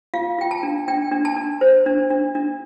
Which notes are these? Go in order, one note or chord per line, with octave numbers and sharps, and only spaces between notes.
F4 F5
F4 G5
A5
D4
D4 G5
D4
A5
D4
C5
D4
D4
D4